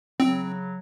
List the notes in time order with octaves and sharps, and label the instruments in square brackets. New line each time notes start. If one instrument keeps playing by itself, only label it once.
[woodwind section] C#3 F#3 [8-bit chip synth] C4